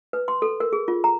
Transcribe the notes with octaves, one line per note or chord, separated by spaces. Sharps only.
B4
C6
A4
A#4
G#4
F4
A#5